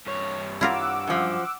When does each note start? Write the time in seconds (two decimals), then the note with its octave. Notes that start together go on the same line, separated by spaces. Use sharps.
0.07 G2 C#5
0.61 E4 F4 A#4 F#5 D6 E6
1.07 F#2 F3